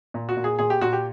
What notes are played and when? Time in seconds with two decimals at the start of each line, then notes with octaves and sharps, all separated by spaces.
0.14 A#2
0.29 F#4
0.37 A#2
0.44 G#4
0.59 A#2 G#4
0.70 G4
0.81 A#2 F#4
0.93 G4